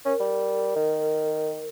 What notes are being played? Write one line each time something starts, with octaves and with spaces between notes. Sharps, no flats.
C#4 A#4
G3
D#3